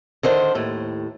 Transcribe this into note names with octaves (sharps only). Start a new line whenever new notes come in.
D3 D#3 D4 C5
D#2 A2